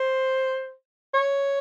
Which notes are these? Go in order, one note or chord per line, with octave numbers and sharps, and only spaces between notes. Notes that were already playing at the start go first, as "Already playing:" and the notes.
Already playing: C5
C#5